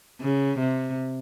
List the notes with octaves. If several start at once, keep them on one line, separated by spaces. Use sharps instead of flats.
C#3
C3